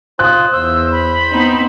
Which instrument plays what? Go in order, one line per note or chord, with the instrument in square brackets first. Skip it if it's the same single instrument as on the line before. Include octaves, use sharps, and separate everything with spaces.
[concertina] F4 C5 [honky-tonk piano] D#6 F#6
[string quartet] E2 [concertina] C5 [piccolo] E6
[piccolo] B5
[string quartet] B3 C4 D#4